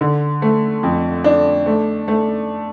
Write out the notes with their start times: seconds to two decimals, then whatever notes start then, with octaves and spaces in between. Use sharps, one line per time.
0.01 D3
0.42 A3
0.83 F2
1.24 D4
1.66 A3
2.08 A3